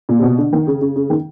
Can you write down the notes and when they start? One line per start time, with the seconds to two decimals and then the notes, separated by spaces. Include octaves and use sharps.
0.09 A#2
0.19 C3
0.23 B2
0.38 D3
0.53 D#3
0.67 C#3
0.81 C#3
0.96 C#3
1.10 D#3